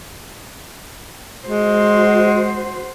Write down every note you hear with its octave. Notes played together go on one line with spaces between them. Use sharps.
G#3 F#4 C5